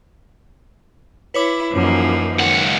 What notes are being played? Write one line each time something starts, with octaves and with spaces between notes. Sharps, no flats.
E4 B4 C#5 D6
F#2 E3 F3 A#3 D#4
C#2 D#3 F#5